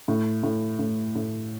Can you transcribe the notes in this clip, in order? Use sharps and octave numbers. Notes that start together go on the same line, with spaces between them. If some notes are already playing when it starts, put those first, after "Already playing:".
A2
A2
A2
A2